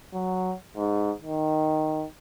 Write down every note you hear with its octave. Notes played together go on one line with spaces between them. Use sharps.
F#3
G#2
D#3